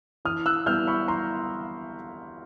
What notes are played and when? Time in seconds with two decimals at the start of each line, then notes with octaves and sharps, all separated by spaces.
0.25 E3 D#6 F6
0.46 E6 F#6
0.66 G3 B3 E4 F6 G6
0.87 B5 C#6
1.08 E3 A#5 C6